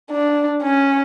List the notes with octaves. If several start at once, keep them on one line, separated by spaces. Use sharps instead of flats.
D4
C#4